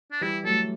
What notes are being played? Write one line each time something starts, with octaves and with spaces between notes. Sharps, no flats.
D4
E3 G3 E4
F#3 A3 A4